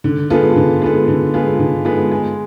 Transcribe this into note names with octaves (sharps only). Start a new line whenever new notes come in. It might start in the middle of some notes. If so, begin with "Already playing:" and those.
D3
G#3 B3 F4 A4
D3
G#3 B3 F4 A4
D3
G#3 B3 F4 A4
D3
G#3 B3 F4 A4
G#3